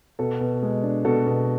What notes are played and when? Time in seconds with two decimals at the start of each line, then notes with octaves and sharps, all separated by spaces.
0.19 B2 F#4 A4
0.40 B2
0.63 G#3
0.83 D4
1.05 B2 F#4 A4
1.27 B2